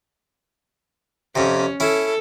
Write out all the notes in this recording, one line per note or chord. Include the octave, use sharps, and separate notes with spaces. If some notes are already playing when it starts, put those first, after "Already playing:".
F2 C3 C#4
C#4 E4 A4